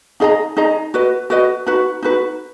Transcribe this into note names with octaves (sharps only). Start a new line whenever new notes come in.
D#4 G#4 D#5 A#5
D#4 G#4 D#5 A#5
F#4 B4 D#5
F#4 B4 D#5
D#4 F#4 B4
D#4 F#4 B4